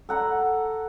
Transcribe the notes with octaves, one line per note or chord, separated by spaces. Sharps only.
A4 F#5 A#5